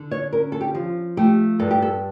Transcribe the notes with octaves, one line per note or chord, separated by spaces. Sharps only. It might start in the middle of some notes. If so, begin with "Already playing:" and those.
Already playing: D3
C#5
C#4 A#4
A4
G4
F3
A3 G4
G2 A4
G4
A4